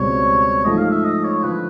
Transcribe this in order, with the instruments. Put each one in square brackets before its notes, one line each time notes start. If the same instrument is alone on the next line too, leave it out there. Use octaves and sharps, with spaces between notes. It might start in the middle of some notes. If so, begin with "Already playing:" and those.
Already playing: [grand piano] C#2 B2 G3 C4 [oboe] C#5
[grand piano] G#2 F3 A3 [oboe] D#5
[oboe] F5
E5
D#5
C#5
[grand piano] D3 F3 [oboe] B4